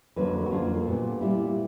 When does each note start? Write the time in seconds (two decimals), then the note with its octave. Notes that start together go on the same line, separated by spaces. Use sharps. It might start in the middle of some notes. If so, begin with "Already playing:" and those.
0.16 F2 D3 F#3 A#3 B4
0.46 F#4
0.51 F2 D3 F#3 A#3 F4
0.87 A#2 G3 B3
1.21 A#2 G3 B3 E4